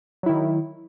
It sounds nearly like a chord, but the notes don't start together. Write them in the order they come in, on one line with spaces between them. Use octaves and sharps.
F#3 E4 D#3